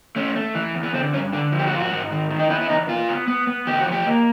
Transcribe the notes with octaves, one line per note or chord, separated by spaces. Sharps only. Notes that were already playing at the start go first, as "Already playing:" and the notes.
A3 C#4
A3
E3
E2
B3
D3 C4
G2 C#4
D3 D4
F3
G4
F#4
G#2 F4
F#4
G#2
D#3
D#3
D#4
B3 E4
E4
E2 D#4
A#2 F4
B3
B3
B3
E2 G4
F#4
F3
G4
A#3